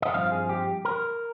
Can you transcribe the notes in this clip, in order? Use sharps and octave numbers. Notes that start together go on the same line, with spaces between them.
D#5
G2 F3 C4 D#4 F5
G#4
G4
A#4